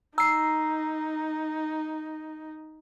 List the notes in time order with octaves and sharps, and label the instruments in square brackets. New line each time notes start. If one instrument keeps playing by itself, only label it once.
[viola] D#4 [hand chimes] A#5 [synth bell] E6 C7